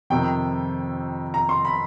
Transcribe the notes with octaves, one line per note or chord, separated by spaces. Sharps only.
F2 C3 D#3 G5
A#5
C6
B5